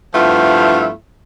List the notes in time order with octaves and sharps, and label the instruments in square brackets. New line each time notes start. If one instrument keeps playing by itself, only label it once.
[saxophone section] G2 F3 A3 B3 E4 F4